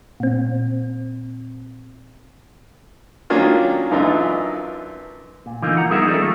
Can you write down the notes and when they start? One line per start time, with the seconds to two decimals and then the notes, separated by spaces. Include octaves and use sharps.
0.20 A#2 C4
3.30 D#3 F#3 A#3 C#4 D4 F4
3.91 F#2 E3 D4 D#4 F4
5.46 A#2
5.62 D3 E3 F3 A#3 D#4 F4
5.77 F#5 A#5
5.90 G3 B3 D#4 G#4 A#4 E5
6.06 F3 C#4 D#4 F4 A4 D5
6.20 D#3 A3